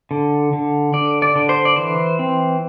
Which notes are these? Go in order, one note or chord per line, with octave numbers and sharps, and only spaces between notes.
D3
D3
D3 D5
D5
D3
C5
D5
E3 C5
C4